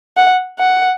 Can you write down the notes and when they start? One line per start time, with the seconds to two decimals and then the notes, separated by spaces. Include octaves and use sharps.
0.17 F#5
0.59 F#5